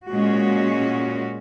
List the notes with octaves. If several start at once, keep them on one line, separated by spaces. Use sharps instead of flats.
A#2 G#3 C#4 F#4